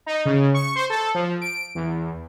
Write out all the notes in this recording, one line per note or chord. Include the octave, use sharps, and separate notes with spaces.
D#4
C#3
C#6
C5
A4
F3
D7
E2